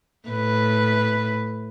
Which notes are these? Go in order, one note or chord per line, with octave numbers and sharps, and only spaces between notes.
A2 B4